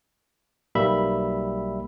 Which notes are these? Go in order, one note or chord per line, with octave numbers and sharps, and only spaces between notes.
B1 G3 A#3 E5 B5